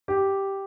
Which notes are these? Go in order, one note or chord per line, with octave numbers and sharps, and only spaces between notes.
G4